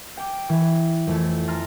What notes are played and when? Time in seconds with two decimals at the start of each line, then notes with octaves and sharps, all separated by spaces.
0.17 G5 D6
0.49 E3
1.07 F2 E3 A3
1.47 A5 A#5 C6 F6